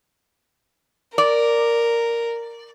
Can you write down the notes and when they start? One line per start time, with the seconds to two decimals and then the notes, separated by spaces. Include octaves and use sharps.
1.18 A#4 D5